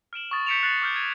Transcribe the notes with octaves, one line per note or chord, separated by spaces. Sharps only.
F6 D7 E7 F#7
C#6 D#6 A6
G6 B6 C#7 D7 E7 F7
F#6 A6 C7 F#7
D6 F6 G6
G#6 D#7